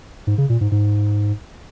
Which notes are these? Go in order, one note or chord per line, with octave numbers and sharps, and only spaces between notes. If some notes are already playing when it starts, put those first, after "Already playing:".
G#2
C#3
A#2
G#2
G#2